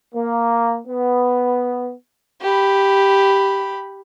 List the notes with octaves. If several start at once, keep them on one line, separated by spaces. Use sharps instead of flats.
A#3
B3
G4 B5